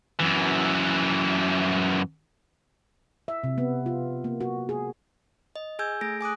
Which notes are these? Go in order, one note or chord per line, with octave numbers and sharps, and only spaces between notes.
F#2 E3
E5
C3
B3
F4
A#3
F#4
G#4
D#5
G#4 G#5 E6 G6 G#6
A3 G#4 A#6 D7
G#5 D6 D#6 F#6